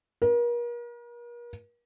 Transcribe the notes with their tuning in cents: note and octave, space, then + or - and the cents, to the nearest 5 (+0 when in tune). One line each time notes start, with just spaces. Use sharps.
A#4 +40